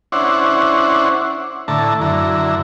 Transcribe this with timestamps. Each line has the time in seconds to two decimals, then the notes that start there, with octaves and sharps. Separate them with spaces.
0.12 C#4 D4 E4 C5 F#5
1.68 A2 D3 E4 A5 A#5
2.01 F#2 D3 E4 A#5